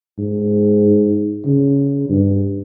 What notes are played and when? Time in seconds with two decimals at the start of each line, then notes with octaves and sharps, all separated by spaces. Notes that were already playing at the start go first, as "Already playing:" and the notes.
0.18 G#2
1.45 C#3
2.09 G2